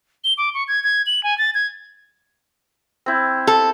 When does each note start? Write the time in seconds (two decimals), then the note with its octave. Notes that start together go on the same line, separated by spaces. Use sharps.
0.24 G7
0.38 D6
0.54 C#6
0.68 G#6
0.84 G#6
1.07 F#7
1.24 G#5
1.38 A6
1.55 G#6
3.06 C4 E4
3.47 A4